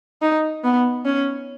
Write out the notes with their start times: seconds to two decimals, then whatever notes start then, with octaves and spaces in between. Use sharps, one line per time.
0.22 D#4
0.64 B3
1.05 C#4